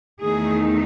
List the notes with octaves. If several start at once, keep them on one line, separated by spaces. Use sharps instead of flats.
E2 D#3 A3 D#4 G#4